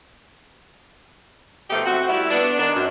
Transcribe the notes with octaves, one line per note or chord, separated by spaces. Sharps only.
B2 F3 A3 D#4 G4
C4 F#4
G3 A3 E4
B3 D4
D#3 D4
F#2